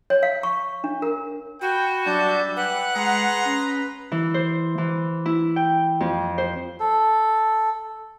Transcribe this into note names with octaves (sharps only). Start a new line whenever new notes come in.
C#5
F5
C#6
D4
A#4
F#4 G5 B5
F#3 G3 D4 E5 A5 G6
B4 F#5 G5
G#3 G#4 A#5 C6
C#4
E3
C5
E3
E4
G5
F2
C5
A4